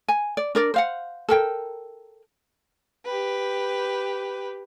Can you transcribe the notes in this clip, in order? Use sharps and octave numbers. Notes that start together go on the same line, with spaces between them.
G#5
D5
D4 A#4 D5
C5 F5 F#5
A4 A#4 G5
G4 B4